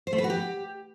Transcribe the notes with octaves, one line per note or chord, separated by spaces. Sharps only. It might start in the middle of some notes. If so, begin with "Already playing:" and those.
C5
A3
B4
F#4
G4